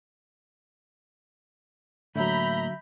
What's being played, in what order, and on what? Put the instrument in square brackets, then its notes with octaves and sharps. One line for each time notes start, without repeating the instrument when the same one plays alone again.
[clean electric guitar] A2 A#3 [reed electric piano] D3 F#3 [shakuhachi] E5 [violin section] A#5 B5 G6